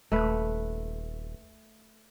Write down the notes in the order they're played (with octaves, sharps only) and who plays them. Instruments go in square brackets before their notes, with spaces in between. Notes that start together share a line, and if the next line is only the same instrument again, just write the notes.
[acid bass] D#1 [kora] A3 B4